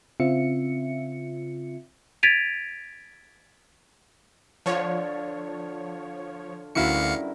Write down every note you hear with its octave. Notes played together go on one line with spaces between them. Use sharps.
C#3 C4 F4 E5 C#7
G#6 A6 B6 D7 D#7 F7
D3 F3 F4 C#5
D2 G2 C#4 E4 F#4 A#4 F5 C#7